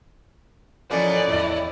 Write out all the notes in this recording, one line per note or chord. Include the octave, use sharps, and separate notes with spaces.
B2 E3 F3 A#3 C#4 A4 C#5 D5
E2 A2 E4 D#5